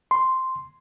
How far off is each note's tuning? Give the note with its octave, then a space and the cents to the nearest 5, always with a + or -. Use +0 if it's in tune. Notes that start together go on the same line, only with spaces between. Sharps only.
C6 -5